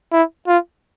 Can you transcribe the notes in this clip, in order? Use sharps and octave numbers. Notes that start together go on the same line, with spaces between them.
E4
F4